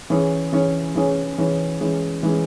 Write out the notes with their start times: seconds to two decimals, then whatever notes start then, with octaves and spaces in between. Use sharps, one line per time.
0.10 E3 C#4 G#4 C#5
0.53 E3 C#4 G#4 C#5
0.95 E3 C#4 G#4 C#5
1.38 E3 C#4 G#4 C#5
1.81 E3 G#3 C#4
2.23 E3 G#3 C#4